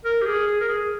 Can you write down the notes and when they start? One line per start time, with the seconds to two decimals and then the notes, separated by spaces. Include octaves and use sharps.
0.05 A#4
0.22 G4
0.26 G#4
0.47 G#4
0.60 A#4
0.69 G#4